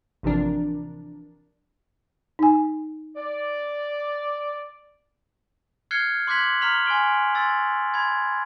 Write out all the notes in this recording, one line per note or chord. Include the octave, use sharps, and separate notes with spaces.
A1 C3 E3 F3 D4 A#4
D#4 G#5
D5
F6 F#6 G#6 C7 C#7 G7
C6 D6 F#6 G#6 B6 F#7
A#5 C#6 F6 B6 F7 F#7
G#5 C6 F6 D7 G7
C6 E6 A6
B5 C6 G#6